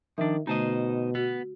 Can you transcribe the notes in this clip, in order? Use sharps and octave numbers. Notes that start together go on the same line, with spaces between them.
D#3 F3 D4 E5
B2 D3 A3 D#4 C5 D#5 A5
B3 F#4